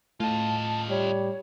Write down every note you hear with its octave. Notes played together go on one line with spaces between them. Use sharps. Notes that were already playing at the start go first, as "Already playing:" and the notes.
A2 F4 D#5 A5
G3 C#5